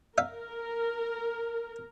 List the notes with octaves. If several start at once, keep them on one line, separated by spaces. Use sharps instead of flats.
A#4 E5 F5